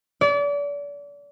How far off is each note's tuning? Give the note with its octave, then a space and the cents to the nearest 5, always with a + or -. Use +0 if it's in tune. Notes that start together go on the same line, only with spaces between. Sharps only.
D5 -35